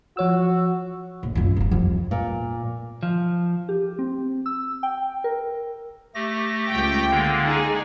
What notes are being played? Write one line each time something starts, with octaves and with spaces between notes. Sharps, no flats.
F3 F#4 C#5 E6
A#1
F#2 F4
D#1 G2
F2
A#2
F3
G4
C4
E6
G5
A#4
A3 G4 A#6
C#2 G5
D3 G#3 A#3
D#4 G#4